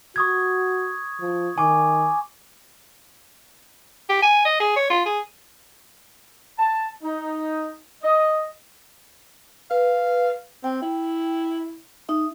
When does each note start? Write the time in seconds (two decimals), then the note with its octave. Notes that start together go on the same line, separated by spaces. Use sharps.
0.16 F#4 C#6 D#6 G#6
1.20 F3
1.58 D#3 G#5 C#6 D6
4.09 G4
4.22 G#5
4.45 D#5
4.60 G#4
4.76 C#5
4.90 F4
5.06 G#4
6.59 A5
7.03 D#4
8.03 D#5
9.71 B4 F5
10.64 C4 G5
10.82 E4
12.09 D#4 E5